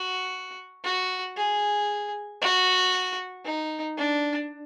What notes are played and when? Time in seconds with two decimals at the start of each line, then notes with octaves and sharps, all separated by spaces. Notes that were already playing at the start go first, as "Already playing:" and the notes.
Already playing: F#4
0.84 F#4
1.37 G#4
2.42 F#4
3.45 D#4
3.98 D4